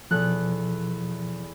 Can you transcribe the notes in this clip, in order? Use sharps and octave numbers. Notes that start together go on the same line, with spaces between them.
E2 B2 F3 A4 F#6